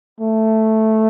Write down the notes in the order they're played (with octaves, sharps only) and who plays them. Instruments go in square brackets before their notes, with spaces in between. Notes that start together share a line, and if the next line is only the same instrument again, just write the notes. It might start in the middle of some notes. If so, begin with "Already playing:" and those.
[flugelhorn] A3